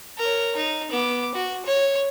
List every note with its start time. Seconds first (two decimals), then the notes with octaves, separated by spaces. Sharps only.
0.18 A#4 C#5
0.57 D#4
0.91 B3 D6
1.35 F#4
1.66 C#5